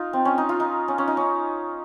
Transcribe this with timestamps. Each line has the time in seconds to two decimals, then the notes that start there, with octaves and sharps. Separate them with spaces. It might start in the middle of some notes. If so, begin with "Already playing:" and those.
Already playing: D#4 F4
0.13 C4
0.25 C#4
0.38 D#4
0.49 F4
0.60 D#4
0.88 C#4
0.98 C#4
1.08 D#4
1.17 C#4